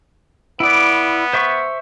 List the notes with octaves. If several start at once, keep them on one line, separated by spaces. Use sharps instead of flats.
B3 E4 D5
C5 E5 C#6